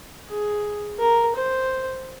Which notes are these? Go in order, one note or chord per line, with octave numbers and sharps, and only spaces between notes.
G#4
A#4
C5